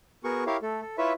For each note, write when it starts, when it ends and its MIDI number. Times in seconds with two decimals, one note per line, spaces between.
0.24 0.44 59
0.24 0.44 66
0.24 0.44 68
0.24 0.44 70
0.24 0.44 85
0.47 0.57 64
0.47 0.57 67
0.47 0.57 70
0.47 0.57 73
0.47 0.57 77
0.62 0.81 57
0.62 0.81 69
0.82 0.96 69
0.98 1.13 64
0.98 1.13 65
0.98 1.13 71
0.98 1.13 73
0.98 1.13 76